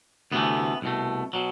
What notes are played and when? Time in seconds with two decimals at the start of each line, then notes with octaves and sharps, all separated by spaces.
0.32 D2 C3 E3 A3 B3
0.82 C2 B2 A3
1.33 B2 F#3